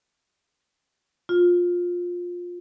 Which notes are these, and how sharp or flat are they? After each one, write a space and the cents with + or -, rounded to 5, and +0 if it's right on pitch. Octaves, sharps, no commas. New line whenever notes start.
F4 +15